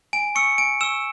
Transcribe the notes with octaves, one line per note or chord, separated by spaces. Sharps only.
G#5 D7
C#6 E6 C#7
G#5 D7
C#6 E6 E7